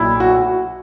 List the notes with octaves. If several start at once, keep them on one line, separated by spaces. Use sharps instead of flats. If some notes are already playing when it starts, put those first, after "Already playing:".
Already playing: B1 A#2 F#3 E4
F#4